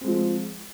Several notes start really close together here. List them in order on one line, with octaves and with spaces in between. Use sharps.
C4 G#3 F3